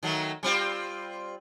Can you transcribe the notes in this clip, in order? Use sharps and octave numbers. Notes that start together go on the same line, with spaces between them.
D#3 F#3 A3
G3 C4 F4